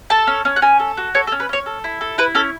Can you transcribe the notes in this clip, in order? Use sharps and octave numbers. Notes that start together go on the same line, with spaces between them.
A4 A5
C#4
C#4
F#5
C#4 G#5
A4
F#4
A4 C#5
A4
C#4
B4
C#4 C#5
A4
E4
A4
E4 B4
C#4 A4